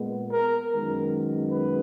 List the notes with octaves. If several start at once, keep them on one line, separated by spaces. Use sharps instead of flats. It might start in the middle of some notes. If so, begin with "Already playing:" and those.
Already playing: A#2 G#3 B3
A#4
F#2 D#3 G#3 B3 A#4
B4